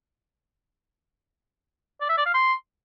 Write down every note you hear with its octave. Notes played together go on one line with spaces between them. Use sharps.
D5
E5
D5
F5
C6